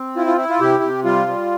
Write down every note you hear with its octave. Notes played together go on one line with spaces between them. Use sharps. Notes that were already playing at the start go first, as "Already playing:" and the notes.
Already playing: C4
E4 F4
F4
E4
F4
C3 G4
C3
G3 F4
G3